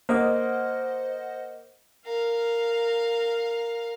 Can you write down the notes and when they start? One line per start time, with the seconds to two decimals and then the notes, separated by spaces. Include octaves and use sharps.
0.09 A#3 C5 D#5 F#5
2.05 A#4 F5